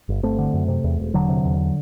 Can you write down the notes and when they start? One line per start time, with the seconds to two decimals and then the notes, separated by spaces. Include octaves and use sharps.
0.09 G1
0.23 G1 A3 C4
0.38 D3
0.54 F#2
0.68 C3
0.84 E2
1.00 E1
1.14 E1 D3 F#3
1.29 C3
1.45 E2